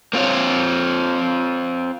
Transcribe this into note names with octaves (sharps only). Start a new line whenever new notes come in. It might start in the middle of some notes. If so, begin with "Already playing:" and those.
A#3 C4 F4 C5 C#5